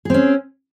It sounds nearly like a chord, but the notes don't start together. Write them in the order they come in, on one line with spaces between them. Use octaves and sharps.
G#4 C4 C#4